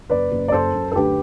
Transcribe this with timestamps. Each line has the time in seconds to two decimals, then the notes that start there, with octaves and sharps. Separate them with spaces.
0.10 F#1 B4 D5
0.31 F#1
0.48 D5
0.52 F#2 A4 C5
0.74 F#2
0.92 A4
0.96 D2 G4 B4